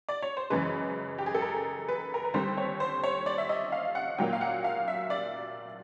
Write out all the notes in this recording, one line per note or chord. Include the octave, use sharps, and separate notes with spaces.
D5
C#5
C5
F#2 C#3 E3 G#3 B4
G4
G#4
A4
A#4
B4
A#4
B4
D#2 D3 G3 C4 C5
C#5
C5
C#5
D5
E5
D#5
F5
F#5
A#2 F#3 A#3 G5
F5
F#5
F5
E5
D5